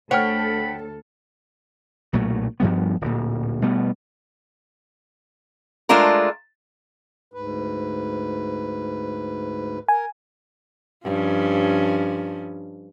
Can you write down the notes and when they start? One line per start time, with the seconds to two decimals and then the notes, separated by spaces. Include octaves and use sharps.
0.11 D2 A4 C#5 F#5 G5 B5 F6
2.13 B1 A#2 F#3 A3
2.60 G2 F3 G3 B3
3.01 D1 A#2
3.62 B2 G3 A3 B3
5.89 G#3 A3 D4 F4 A#4
7.34 D2 G#2 B4
9.89 A#4 G#5
11.04 G2 F3 C#4